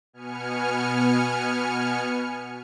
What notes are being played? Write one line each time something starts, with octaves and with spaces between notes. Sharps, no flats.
B2 B3 G#5 F6 C#7